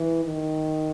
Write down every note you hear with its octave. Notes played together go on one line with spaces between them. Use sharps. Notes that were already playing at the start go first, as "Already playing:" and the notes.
Already playing: E3
D#3